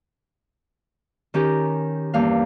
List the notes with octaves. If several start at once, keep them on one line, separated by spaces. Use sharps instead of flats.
D#3 C#4 G4 A#4
E2 G2 A#3 F5